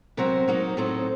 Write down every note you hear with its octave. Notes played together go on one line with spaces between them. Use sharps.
C3 F#3 C4 A#4
F#3 A#3 D#4
A2 F#3 C4 D#4 A4